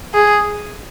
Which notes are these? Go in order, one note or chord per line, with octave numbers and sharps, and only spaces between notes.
G#4